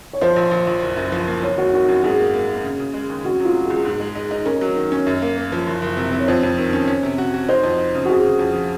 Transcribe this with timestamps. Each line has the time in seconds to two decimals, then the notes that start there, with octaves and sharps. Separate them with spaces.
0.13 C#5
0.21 F3 C5
0.36 A#1
0.51 A#1
0.67 A#1
0.82 F#1
0.97 F#2
1.12 F3
1.27 A#3
1.42 F#1 C#5
1.58 F#1 F#4
1.73 D#3 F#4
1.88 F#2 F#4
2.03 G#2 G#4
2.19 A#3
2.33 A#3
2.48 A#3
2.64 C#3
2.80 C#3
2.94 G#3
3.09 D#2
3.24 C#3 F#4
3.40 F#3 F4
3.54 F#3
3.65 C#2 G#4
3.85 G#2 G#4
4.00 G#3
4.15 D#4
4.31 D#4
4.46 C#4 A#4
4.61 F#3
4.76 D#3
4.92 C#4
5.07 F#2
5.22 A#3
5.37 A#3
5.52 F3
5.67 F#1
5.82 F#1
5.97 C3
6.12 C3
6.19 C#5
6.28 F2 C5
6.43 F2
6.59 D#3
6.73 C#4
6.88 C#4
7.03 C3
7.18 F#4
7.34 F#4
7.48 D#4 C5
7.63 F2
7.79 D#4
7.95 C#3
8.05 F#4
8.09 C#3 G#4
8.25 C#3
8.39 F2
8.54 F3